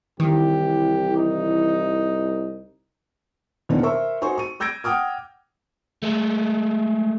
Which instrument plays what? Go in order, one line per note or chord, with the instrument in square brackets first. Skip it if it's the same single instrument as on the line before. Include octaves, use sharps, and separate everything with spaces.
[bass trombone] C2 [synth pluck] D#3 [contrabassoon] E3 [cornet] G4
[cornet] D#4
[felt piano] E2 B2 D#3 A#3 C4 D4
A#4 C5 E5 C#6 E6
D#4 F#4 C5 G#5 C#6
C#6 D#7
E6 G6 G#6 A#6 D7
F#5 G5 D6 D#6 F6
[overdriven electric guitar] G#3 A3